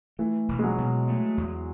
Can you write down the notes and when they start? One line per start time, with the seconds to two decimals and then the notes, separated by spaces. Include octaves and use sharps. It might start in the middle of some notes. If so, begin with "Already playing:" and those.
0.19 E3 A3
0.48 E1
0.59 G#3
0.64 F#3
0.78 B2
1.08 A3
1.37 E2